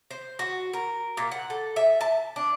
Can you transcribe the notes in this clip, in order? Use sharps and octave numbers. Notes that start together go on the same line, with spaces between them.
C5
F#4
A#4
A#2
F#5
A4
E5
A5
D4